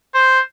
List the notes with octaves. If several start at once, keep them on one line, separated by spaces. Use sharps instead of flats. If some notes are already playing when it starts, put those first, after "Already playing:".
C5